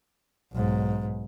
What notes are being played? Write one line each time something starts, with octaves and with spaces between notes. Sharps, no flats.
B1 G#2